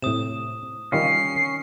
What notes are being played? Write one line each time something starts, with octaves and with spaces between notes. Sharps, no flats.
A2 C3 D#6 E7
D#3 G3 C#4 F4 C7